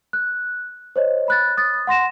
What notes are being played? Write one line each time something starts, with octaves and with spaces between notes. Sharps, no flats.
F#6
C5 C#5 D#5
B5 F#6 A6
D#6 A6
F#5 C6 A#6 E7